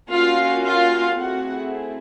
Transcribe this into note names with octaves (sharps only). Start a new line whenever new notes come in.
A#3 C#4 F4 F#4 F5
F4 F5
A3 C4 E4 F#4 G#4 F#5